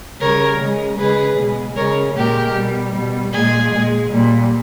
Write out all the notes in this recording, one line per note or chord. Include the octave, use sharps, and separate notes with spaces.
C#3 G3 A#4 C#5
C#3 G#3
C#3 G#3 G#4 B4
B2 G#3
C#3 G#3 A#4 C#5
A#2 G#3 G4 A#4
B2 G3
B2 G3
A#2 G#3 G#4
A#2 G#3
A#2 G3